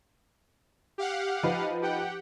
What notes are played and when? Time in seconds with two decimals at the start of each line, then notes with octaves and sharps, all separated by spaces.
0.98 G4 F5 F#5
1.43 F3 D#4 B4
1.82 G4 F#5 G5